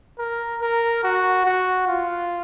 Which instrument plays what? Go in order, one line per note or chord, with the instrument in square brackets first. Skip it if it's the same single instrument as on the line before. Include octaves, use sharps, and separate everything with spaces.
[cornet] A#4
A#4
F#4
F#4
F4